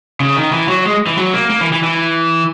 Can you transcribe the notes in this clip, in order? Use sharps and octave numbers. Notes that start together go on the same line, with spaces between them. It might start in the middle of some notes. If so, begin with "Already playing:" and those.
C#3
D#3
E3
F#3
G#3
E3
F#3
A#3
A#3
E3
E3
E3